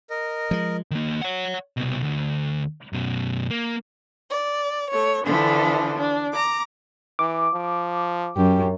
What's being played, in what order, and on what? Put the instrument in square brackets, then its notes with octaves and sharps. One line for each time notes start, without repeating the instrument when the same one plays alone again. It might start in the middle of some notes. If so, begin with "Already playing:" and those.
[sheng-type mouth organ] A#4 D#5
[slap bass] F3 G#3
[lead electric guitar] D#3 A#3
C#5 F#5
C2 B2
D2
F#2 B2
A#3
[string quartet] D5
A3 C#5
D3 E3 F3 D4 A4
D4
A#5 D6
[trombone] E3 [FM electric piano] D6
[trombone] F3
[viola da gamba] F#2 [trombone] G4